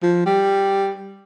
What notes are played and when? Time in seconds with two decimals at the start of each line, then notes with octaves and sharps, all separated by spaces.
0.03 F3
0.26 G3